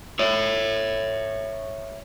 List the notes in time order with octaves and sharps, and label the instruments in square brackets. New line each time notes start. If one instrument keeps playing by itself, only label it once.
[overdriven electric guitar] C#5 E5